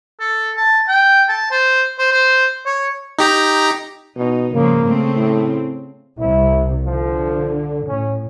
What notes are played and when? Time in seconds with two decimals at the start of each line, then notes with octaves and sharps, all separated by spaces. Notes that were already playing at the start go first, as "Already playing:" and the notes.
0.20 A4
0.57 A5
0.88 G5
1.29 A5
1.51 C5
1.99 C5
2.12 C5
2.66 C#5
3.19 D#4 G4 A#5
4.16 B2 D#4
4.53 G#2 C#3 F3 A#3
4.86 C#3 A3 C4
5.16 A2
6.19 C2 C3 E4
6.85 D3 F3
7.87 A2 C#4